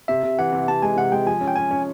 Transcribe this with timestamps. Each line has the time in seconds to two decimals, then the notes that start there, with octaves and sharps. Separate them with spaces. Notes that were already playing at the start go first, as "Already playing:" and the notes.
0.08 C3 E5
0.23 C3
0.39 E3 F#5
0.52 C3
0.68 C3 A5
0.82 G#3 G#5
0.97 C3 F#5
1.12 G#3 G5
1.26 F3 G#5
1.41 C#4
1.48 G5
1.56 C#4 G#5
1.71 C#4